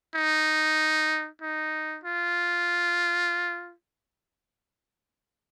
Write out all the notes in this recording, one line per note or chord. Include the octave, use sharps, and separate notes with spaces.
D#4
D#4
F4